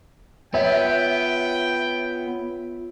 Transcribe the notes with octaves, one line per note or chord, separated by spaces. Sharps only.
B3 F4 C#5 E5 G5